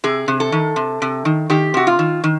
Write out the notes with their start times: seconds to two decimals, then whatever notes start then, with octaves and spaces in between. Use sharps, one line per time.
0.04 C3 G#4
0.28 C3
0.40 A4
0.52 D#3
0.76 C3
1.02 C3
1.25 D#3
1.50 D#3 G4
1.74 C3 F#4
1.87 F4
1.99 D#3
2.24 D#3